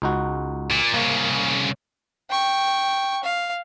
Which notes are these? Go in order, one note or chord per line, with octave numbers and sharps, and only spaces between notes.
C#2 D#4 F#4
A#2
C2 C#3 A#3
G5 C#6
F5